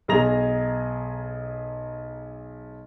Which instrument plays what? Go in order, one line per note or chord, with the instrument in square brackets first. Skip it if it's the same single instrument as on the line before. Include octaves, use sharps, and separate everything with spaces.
[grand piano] B1 G#4 A#5 A#6 F7